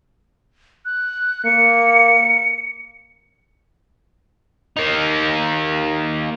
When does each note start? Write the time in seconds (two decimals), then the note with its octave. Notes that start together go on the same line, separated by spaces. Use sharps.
0.85 F#6
1.45 A#3 C#7
4.77 A#3 D#4